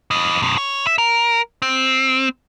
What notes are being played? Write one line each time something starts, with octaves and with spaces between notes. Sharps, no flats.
E3 D#5
F#2 B2
C#5
E5
A#4
C4